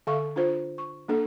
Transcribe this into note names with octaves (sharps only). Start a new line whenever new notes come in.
D3 A4 E5 F5 C#6
D4 F4 C5
C#6
A#3 D4 A4